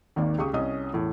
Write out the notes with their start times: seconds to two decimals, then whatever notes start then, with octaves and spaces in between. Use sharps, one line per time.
0.16 G#1 D#2 D#3 A#3 D5
0.38 C#2 G4 C#6 D#6
0.53 C2 C#4 D#5 D#6
0.93 E2 A2